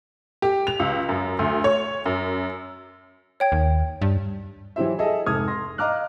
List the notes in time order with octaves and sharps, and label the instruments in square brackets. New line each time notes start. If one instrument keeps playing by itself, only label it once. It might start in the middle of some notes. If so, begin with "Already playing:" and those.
[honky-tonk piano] G4
F7
C#2
F#2
D2
C#5
F#2
[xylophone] C#5 G5 G#6
[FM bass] D#2
G2
[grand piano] E3 F#3 E4 G4 C5 E5
G#4 A4 D#5 E5
F1 G#2 A4 D#6 F6 G#6
C6 A#6
D#5 F5 A#5 D6 F6 F#6